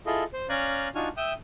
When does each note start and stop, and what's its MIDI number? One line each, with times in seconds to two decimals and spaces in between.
0.06 0.24 64
0.06 0.24 65
0.06 0.24 68
0.06 0.24 69
0.06 0.24 75
0.33 0.47 72
0.49 0.88 61
0.49 0.88 74
0.49 0.88 77
0.49 0.88 80
0.49 0.88 82
0.49 0.88 90
0.95 1.08 62
0.95 1.08 63
0.95 1.08 65
0.95 1.08 66
0.95 1.08 80
0.95 1.08 89
1.17 1.33 76
1.17 1.33 79
1.17 1.33 87
1.17 1.33 88